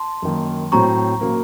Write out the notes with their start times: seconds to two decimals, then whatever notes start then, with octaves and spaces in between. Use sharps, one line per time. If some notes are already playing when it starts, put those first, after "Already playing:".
Already playing: A5 C6
0.22 F#2 D#3 A#3
0.72 A2 F#3 C4 A#5 C#6
1.21 C#3 F#3 A#3